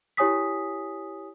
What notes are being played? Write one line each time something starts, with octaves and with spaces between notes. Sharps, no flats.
E4 G4 C#5 G#5 D#6 B6